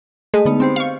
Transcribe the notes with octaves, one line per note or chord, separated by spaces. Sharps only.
G#3 A3 D#5
D3 B3 D#4
C4 G4 C5
F5 C#6